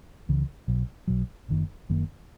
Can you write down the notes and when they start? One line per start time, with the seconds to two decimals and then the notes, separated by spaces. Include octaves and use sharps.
0.29 C#2 C#3 E3
0.67 B1 B2 F#3
1.08 B1 B2 F#3
1.48 F#1 F#2 D#3 A#3
1.89 F#1 F#2 D#3 A#3